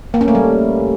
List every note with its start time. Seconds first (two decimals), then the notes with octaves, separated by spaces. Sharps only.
0.14 A#3
0.21 C#4
0.28 A3
0.35 G3